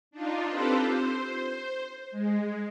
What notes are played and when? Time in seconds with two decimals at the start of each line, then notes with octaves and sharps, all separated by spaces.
0.11 D4 D#4 F4
0.47 C4 F4 G4 A4 B4 C5
0.87 C5
2.11 G#3